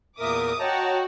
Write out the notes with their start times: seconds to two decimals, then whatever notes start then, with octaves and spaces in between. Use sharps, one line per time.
0.19 E2 A#2 A#4 E5 D6 D#6
0.60 F#4 C#5 D#5 G5 A5 A#5